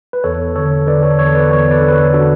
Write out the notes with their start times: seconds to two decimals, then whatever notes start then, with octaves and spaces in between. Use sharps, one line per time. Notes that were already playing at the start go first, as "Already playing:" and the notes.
0.13 B4
0.24 E2 A4 C#5
0.56 D3 A4 C#5
0.87 D3 B4 D5
1.03 A4 C#5
1.18 E2 A4 C#5
1.35 B4 D5
1.50 E2 A4 C#5
1.71 B4 D5
1.81 D3
1.88 B4
1.92 A4 C#5
2.13 D3 F#4 A4